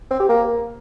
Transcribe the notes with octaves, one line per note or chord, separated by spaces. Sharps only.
C4
G4
A#3